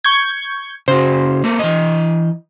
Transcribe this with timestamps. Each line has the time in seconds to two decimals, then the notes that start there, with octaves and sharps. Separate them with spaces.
0.04 C#6 G6 G#6
0.88 C#3 F#4 C5
1.44 A#3 A4
1.59 E3 D#5